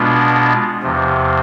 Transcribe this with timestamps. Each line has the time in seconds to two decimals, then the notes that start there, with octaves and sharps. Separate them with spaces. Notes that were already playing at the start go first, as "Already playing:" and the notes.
Already playing: B2 G#3 B3 D4 F4
0.83 E2 C3 F3